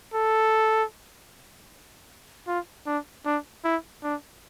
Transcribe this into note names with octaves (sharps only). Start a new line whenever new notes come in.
A4
F4
D4
D4
E4
D4